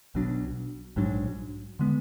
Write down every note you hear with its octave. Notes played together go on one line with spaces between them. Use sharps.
B1 B2 F#3 D4
A#1 G#2 F#3 D4
D3 G#3 B3